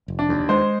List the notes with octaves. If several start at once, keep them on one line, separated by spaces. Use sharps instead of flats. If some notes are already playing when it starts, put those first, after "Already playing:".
F1
D4
D#2
G#3 C5